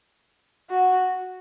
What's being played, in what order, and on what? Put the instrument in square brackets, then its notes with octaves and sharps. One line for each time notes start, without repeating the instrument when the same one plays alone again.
[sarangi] F#4